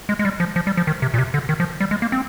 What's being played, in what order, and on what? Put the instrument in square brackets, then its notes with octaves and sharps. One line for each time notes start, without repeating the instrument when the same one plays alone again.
[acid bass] G#3
G#3
G3
F3
F3
G3
F3
D#3
C3
A#2
C3
D3
D#3
F3
G3
G#3
A#3
C4